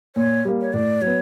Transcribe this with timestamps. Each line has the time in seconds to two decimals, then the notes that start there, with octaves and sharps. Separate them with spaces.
0.16 A#2 C#5
0.45 G3 A#3
0.61 C#5
0.73 A2 D5
1.02 F#3 B3 C#5